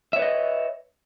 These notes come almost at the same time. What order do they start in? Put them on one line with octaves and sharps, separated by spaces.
E5 C#5 B4 D#5